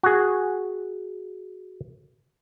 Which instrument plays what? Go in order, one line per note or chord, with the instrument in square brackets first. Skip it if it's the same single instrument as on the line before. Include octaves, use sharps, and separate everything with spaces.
[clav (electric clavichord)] F#4 G#4